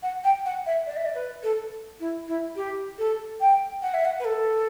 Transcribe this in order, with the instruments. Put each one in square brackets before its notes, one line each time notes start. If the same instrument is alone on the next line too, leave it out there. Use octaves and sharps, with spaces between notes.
[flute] F#5
G5
F#5
E5
D5
E5
D5
B4
A4
E4
E4
G4
A4
G5
F#5
E5
F#5
B4
A4